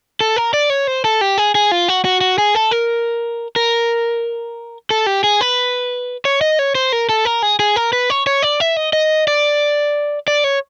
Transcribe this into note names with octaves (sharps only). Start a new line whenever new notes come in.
A4
A#4
D5
C#5
C5
A4
G4
G#4
G#4
F4
F#4
F#4
F#4
G#4
A4
A#4
A#4
A4
G4
G#4
B4
C#5
D#5
C#5
C5
A#4
A4
A#4
G#4
G#4
A#4
B4
C#5
C#5
D5
E5
D#5
D#5
D5
D5
C#5